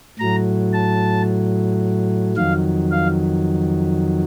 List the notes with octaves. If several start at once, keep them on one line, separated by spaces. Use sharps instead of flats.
A2 F#3 A#5
A5
F2 D#3 F#3 F5
F5